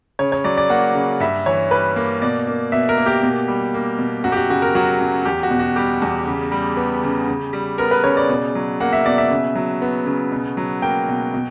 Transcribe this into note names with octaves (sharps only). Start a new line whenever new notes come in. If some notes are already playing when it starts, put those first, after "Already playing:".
C#3 C#5
C#5
F#3 D5
D5
A#3 F#5
C#3
G2 E5
E3 C#5
G3 B4
A#3
B2 D5
A#3
B2 E5
A#4
A#3
G4
B2
G3
A#3
B2
F#2 F#4
G4
F#4
C#3 F#4
A#4
F#3 F#4
F#2
E2 G4
F#4
B2
F#4
G3 G4
E2
C#3
G3
B3
C#3
C#3
G3
B3 A#4
B4
C#3 C#5
D5
B2
F#3
A#3 F#5
E5
B2 D5
E5
C#3
F#3
B3
C#3
B2
F#3
A#3 G5
B2
B2